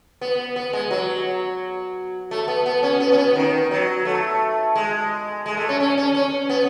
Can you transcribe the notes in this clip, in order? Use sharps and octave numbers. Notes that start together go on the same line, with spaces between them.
B3
B3
G#3
F#3
A3
B3
B3
C#4
B3
C#4
B3
D#3
F#3
A3
G#3
G#3
A3
C#4
C#4
C#4
C#4
B3